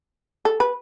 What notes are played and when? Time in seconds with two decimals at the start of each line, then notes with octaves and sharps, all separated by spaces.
0.45 A4
0.60 B4